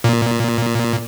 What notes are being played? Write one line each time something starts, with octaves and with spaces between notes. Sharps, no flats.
A#2